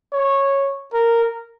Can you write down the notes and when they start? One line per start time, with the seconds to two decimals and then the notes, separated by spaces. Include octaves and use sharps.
0.13 C#5
0.94 A#4